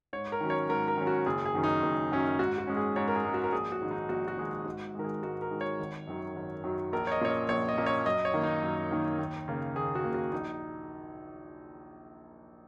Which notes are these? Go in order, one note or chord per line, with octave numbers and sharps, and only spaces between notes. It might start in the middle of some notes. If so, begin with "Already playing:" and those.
G#2 C#5
A#4
D#3 F#3 C#4
C#5
G#2 A#4
A#4
D#3 F#3 C#4
F#4
F#1 G#4
G#4
F#2 D#3 F#3 C#4
D#4
F#1
F#2 D#3 F#3 C#4
G#2 F#4
F#4
G#3 C#4
G#4
G#2 C#5
A#4
G#4
G#3 C#4
F#4
A#4
A#1 G#4
F#4
G#2 D#3 G#3
D#4
A#1 F#4
F#4
G#2 D#3 G#3
G#2 F#4
D#3 G#3 A#4
G#4
G#2 F#4
A#4
D#3 G#3
C#5
G#1
F#2 D#3 F#3
G#1
F#2 D#3 F#3
A#1 A#4
C#5
D#5
A#2 A#3 C#4 C#5
D#5
A#1 C#5
D#5
A#2 A#3 C#4
C#5
F#2 D#5
C#5
D#3 A#3
D#4
F#2
D#3 A#3
D#2
C#3 A#3
D#2 G#4
F#4
C#3 A#3
F#4
A#1 D#4